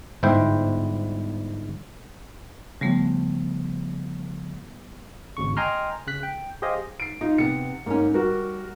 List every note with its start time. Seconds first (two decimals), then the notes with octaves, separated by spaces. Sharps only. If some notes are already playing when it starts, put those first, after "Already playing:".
0.23 G1 G#2 E4 C5 G5
2.81 C#3 F3 G3 A3 B3
5.37 G#1 D2 C#3 C#6
5.57 D#5 G5 G#5 A#5 C6 F6
6.07 C#3 F#6 B6
6.23 G5
6.62 G4 G#4 C5 D#5 F5 G#5
7.00 C7 D7
7.21 D#4 F4
7.38 C3 B3 C#7
7.86 G#2 A#3 B3 C#4
8.14 G3 F#4 A#4